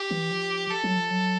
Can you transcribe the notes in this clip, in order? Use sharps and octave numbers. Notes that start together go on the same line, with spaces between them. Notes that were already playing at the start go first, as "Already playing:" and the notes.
Already playing: G4
E3
F3
A4
F#3
F3
F#3